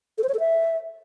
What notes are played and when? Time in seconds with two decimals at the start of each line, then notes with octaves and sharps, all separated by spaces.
0.18 A4
0.23 C5
0.29 C#5
0.34 A4
0.40 E5